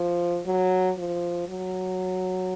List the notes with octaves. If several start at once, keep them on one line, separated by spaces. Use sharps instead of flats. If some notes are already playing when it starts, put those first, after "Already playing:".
Already playing: F3
F#3
F3
F#3